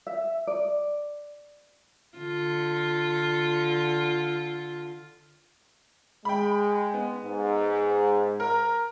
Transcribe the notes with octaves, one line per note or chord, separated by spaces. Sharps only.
E5
D5
D3 F4
G#3 G5 B5
B3
G#2
A#4